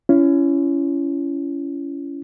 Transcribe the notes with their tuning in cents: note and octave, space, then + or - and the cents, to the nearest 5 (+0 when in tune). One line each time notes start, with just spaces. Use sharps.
C#4 +15 E4 +30